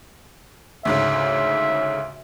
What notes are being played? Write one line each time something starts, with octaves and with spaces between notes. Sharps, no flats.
D2 G#2 C#3 E5